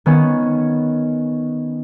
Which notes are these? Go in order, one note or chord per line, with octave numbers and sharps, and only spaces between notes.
D#3 B3 C#4